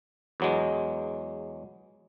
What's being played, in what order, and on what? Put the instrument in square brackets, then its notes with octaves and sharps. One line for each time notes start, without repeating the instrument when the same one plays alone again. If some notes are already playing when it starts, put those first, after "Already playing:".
[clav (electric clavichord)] E2 F#3 G#3